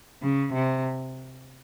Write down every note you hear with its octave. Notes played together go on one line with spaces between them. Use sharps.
C#3
C3